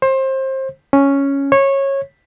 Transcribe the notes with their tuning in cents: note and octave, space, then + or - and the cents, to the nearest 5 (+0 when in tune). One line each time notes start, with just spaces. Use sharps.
C5 +25
C#4 +0
C#5 -15